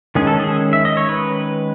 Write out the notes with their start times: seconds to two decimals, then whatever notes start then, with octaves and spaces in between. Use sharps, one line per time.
0.15 D#3 G#3 C#4 G#4
0.27 A4
0.40 G#4
0.73 E5
0.85 D#5
0.97 C#5
1.09 B4